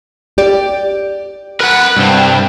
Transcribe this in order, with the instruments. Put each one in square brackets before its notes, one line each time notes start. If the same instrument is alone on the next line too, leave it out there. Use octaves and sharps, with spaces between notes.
[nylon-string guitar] G4 D5
[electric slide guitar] A#4 F#5 [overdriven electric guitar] B4
[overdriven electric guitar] C2 C4 [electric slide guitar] G2